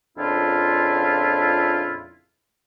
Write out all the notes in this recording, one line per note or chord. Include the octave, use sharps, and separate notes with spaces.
F2 A#2 C#3 D4 E4 F4